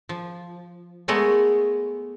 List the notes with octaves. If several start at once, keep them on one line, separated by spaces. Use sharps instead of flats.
F3
G#3 A3 B3 G#4 A#4 C#5